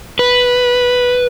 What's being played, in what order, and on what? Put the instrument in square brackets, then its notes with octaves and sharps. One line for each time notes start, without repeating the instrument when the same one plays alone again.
[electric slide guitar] B4